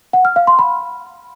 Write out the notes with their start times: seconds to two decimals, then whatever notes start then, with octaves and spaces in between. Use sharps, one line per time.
0.13 F#5
0.25 F6
0.36 F5
0.47 C6
0.59 B5